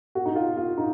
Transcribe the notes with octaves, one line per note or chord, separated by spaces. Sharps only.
F#4
D#4
F4
F4
D#4